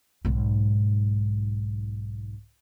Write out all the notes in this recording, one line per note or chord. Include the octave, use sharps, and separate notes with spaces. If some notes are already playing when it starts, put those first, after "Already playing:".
B1 G#2